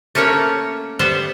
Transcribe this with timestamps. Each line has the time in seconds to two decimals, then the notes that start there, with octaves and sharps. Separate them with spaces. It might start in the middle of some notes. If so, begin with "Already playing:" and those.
0.15 A3 A#3 C#4 C#5 F#5
0.99 G3 B3 C5 F#5